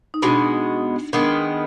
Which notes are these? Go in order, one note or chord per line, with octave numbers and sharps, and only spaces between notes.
D#4
B2 G#3 B3 D4
D#3 G#3 B3 D4